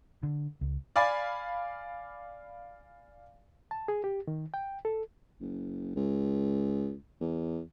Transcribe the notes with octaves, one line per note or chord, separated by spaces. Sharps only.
D3
C#2
D5 F5 G#5 B5 A6
A5
G#4
G4
D#3
G5
A4
F#1
C#2
E2